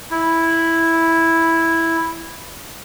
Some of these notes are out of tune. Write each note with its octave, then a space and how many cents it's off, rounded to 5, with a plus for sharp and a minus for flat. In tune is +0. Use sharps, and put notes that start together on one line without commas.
E4 -5